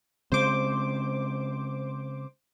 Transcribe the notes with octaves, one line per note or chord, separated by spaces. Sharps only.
C#3 G#3 C4 C5 D6